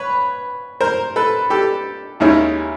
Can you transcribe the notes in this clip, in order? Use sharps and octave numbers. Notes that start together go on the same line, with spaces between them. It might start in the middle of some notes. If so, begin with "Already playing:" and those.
Already playing: B4 C#5
A#4 C5
A4 B4
G4 A4
D#2 D#3 G#3 C#4 E4